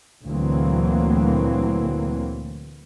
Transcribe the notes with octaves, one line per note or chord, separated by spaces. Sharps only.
D2 A#2 E3 F#3 A#3 C4